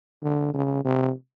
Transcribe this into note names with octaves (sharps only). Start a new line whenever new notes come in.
D3
C#3
C3